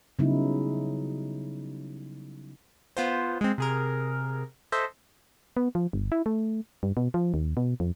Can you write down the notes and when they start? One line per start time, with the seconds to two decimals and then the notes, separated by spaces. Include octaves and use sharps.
0.19 C#3 F#3 G3 B3 D#4 E4
2.97 B3 F4 C5
3.41 G#3 C4
3.58 C3 G#4 A#4
4.72 A4 C5 D#5 E5
5.57 B3
5.75 F3
5.93 G1
6.12 E4
6.26 A3
6.83 G2
6.97 B2
7.14 F3
7.34 D#2
7.57 B2
7.80 F2